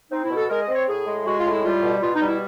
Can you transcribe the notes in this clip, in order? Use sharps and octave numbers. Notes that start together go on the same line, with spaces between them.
C4 D#4
E4
B2
A4
G#3 A#4
D#5
C4
C#5
A2 G#4
G#3
G#3 F#4
F4
A2
E4
G3 F4
B2
B2 F4
D#4
G3
E4